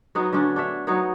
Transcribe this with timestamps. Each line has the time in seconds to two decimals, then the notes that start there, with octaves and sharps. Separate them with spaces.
0.15 F#3 B3 D#4
0.32 D3 A3 C#4 D4
0.56 D4 C#5 E5
0.87 F#3 B3 D#4 C#5